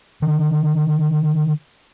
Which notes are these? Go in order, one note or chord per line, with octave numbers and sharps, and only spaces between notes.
D3 D#3